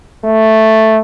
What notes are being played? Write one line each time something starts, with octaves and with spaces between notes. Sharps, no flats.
A3